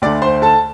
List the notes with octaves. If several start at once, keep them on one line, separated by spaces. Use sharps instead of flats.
D2 D3 A3 D5 D6
C5 C6
A4 A5